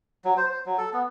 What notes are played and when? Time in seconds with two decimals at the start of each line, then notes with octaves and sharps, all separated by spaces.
0.24 F#3
0.37 C5
0.49 C5
0.66 F#3
0.78 A4
0.93 B3